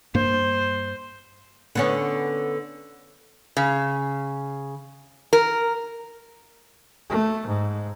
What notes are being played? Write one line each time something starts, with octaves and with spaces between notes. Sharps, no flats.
G2 A#3 C5
D3 B3 C#4
C#3
A#4
A3
G#2